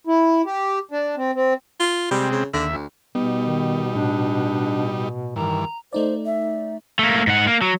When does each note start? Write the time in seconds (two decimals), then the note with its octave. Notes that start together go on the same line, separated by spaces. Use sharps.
0.07 E4
0.46 G4
0.91 D4
1.16 C4
1.35 C4
1.80 F4
2.11 C3 G3 G#3 C4
2.31 C#3
2.53 D#2 D3 E5
2.72 D2
3.15 B2 G3 B3 D#4
3.47 D#3
3.95 A2 D4
5.36 G2 D#3 E3 A#5
5.93 A3 D#4 C5 D5
6.26 E5
6.99 A3 A#3
7.27 G#2 F#5
7.47 A#3
7.62 F#3